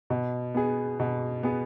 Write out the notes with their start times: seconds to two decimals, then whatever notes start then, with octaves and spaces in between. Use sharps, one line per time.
0.10 B2
0.55 B3 G#4
1.00 B2
1.43 B3 G#4